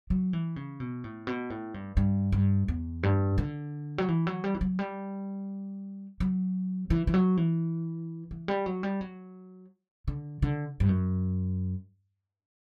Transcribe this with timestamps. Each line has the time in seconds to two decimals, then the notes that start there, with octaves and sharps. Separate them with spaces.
0.10 F#3
0.33 E3
0.56 C#3
0.80 B2
1.04 A2
1.27 B2
1.50 A2
1.74 G2
1.97 G2
2.32 G2
2.68 E2
3.03 G2
3.38 D3
3.98 F#3
4.08 E3
4.27 F#3
4.44 G3
4.54 E3
4.61 F#3
4.79 G3
6.20 F#3
6.90 E3
7.07 E3
7.14 F#3
7.37 E3
8.31 E3
8.48 G3
8.66 F#3
8.83 G3
9.01 F#3
10.08 D3
10.42 D3
10.80 G2
10.89 F#2